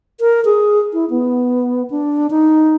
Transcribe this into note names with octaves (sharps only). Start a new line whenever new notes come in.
A#4
G#4
E4
B3
D4
D#4